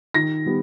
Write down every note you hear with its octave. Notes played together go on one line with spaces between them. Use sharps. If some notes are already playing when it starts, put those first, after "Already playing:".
D#3 A#6
G3 B3